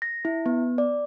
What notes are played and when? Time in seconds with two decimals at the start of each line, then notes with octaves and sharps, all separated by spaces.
0.02 A#6
0.25 E4
0.46 B3
0.78 D5